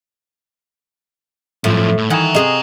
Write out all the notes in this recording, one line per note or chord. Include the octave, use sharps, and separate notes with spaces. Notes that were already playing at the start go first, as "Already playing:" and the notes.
F#2 A2 F3
A2
D#3 E3 F#5 A#5
C3 G#4 D#5